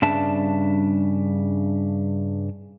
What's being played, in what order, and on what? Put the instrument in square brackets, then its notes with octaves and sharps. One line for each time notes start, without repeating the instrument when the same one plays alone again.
[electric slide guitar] G2 C#3 G3 D4 E5 A5